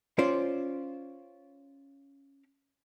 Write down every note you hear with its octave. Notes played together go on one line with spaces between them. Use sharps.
C#4 F4 C5 D5